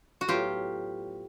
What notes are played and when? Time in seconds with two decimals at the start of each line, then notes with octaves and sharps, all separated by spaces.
0.21 F#4
0.28 A2 F#3 B3 F4 G4